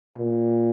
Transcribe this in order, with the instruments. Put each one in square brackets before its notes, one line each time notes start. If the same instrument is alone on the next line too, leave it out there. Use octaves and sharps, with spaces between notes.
[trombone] A#2